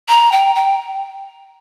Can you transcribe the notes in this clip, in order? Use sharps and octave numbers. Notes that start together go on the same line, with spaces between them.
A#5
G5
G5